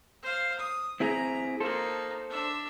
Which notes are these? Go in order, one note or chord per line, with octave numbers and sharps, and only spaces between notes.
C5 F5
D#6
C4 E4 G#4 A#5
A#3 D#4 A4 C5
D4 E5